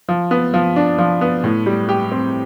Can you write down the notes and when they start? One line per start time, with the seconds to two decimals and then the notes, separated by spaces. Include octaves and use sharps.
0.09 F3
0.31 B3
0.54 F3
0.76 D4
0.98 F3
1.21 B3
1.44 A2
1.66 G3
1.89 G4
2.12 C4